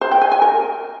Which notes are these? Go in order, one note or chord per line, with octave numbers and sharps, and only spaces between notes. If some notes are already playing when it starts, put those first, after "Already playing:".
C5
G5
G#5
G#5
A#4